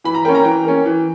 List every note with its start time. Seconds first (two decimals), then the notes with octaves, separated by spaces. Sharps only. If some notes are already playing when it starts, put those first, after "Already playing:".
0.04 E3 B5
0.14 A#5
0.25 A#3 C#4 G5
0.35 A#5
0.45 E3 G5
0.64 A#3 C#4
0.86 E3